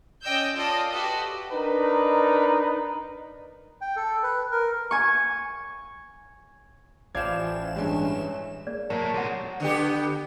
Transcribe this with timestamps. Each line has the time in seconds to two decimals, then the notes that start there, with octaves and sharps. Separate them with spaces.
0.23 C#4 D5 D#5 G5 E6 G6
0.55 F4 A4 D5 D#5
0.90 F#4 G4 A4 B4 D#5
1.52 D4 D#4 A#4 B4
3.81 G5
3.96 A4
4.23 B4
4.51 A#4
4.91 G#5 C#6
7.15 A1 E3 F3 D5 F5 G5 G#6 E7
7.76 G2 G#3 C#4
8.67 A#3 G#4 D5
8.90 F#3 A4 A#4 C#5 A#5
9.15 G#3 C4 G#4 F#5
9.60 D3 B3 G4